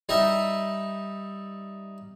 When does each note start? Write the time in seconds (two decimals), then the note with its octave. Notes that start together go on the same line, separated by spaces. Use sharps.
0.09 G3 D#4 D#5 E5